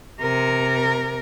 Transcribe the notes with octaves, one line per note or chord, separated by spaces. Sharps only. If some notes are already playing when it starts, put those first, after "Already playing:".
C3 A#4